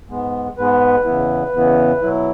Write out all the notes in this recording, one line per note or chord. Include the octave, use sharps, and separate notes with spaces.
G#2 G#3 B3
G#2 G#3 B3 B4
E2 C#3 E3 B3 E4
E2 C#3 E3 B3 E4
B2 F#3 E4